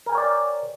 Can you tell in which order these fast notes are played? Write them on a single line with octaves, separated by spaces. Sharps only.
A#4 G#5 G5 C#5 D5